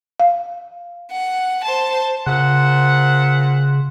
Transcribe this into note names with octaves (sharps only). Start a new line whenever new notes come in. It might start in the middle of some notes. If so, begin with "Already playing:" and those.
F5
F#5
C5 A5
A#2 C#3 C5 F#5